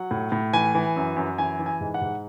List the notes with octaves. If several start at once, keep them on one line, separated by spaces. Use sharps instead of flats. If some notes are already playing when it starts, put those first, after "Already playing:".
Already playing: F#3 F#5
A2
A2
E3 G#5
E3
F#2
F#2
E3 G#5
E3
G#5
G#2
F#5
G#2